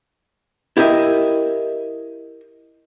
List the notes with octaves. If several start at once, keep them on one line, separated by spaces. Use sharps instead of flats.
E4 G4 A#4 D#5 E5